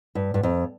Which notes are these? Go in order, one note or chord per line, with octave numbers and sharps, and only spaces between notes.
G2
G2
F2